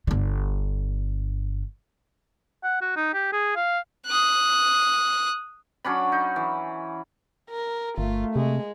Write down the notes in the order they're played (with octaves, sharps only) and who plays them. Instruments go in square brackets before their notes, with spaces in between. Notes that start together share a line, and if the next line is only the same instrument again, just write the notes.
[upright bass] G1 D3
[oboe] F#5
F#4
D#4
G4
G#4
F5
[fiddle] D#6 F#6
[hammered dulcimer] F#3 C#4 D4 B5
D#4
E3
[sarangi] A#4
[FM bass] G1 [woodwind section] A3 [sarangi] F4
[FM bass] C3 [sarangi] G#3